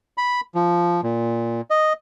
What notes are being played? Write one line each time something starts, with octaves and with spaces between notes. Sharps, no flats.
B5
F3
A#2
D#5